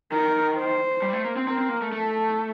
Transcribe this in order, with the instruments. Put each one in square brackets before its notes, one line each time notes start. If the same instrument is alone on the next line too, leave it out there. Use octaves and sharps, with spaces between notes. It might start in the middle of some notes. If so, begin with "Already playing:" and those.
[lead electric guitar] D#3 [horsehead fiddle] A#4
[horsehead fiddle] C5
[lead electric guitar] G3
A3
A#3
C4
[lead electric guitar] C4 [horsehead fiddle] A#4
[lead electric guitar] C4
A#3
A3
[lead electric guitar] A3 [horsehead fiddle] A4